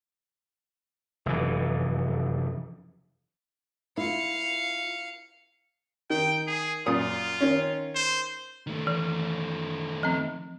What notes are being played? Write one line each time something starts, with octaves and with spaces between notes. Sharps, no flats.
F1 F#2 E3
E4 F4 F5 C#7
D#3 G5
G#4
F#2 A#2 F4 D#6
D#3 C#4
C5
D#3 A3
E3
F3 C4